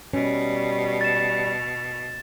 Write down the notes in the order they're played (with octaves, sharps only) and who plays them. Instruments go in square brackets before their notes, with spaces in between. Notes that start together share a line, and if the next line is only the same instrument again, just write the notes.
[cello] B2 [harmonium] G3 [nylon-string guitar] C#4
[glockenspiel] A6 E7